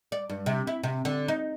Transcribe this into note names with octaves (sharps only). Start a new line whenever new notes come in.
D5
G2
C3
E4
C3
D3
D#4